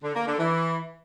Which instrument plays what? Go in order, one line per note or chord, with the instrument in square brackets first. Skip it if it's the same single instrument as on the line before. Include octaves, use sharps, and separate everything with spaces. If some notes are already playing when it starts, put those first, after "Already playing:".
[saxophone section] D3
A#3
D3
E3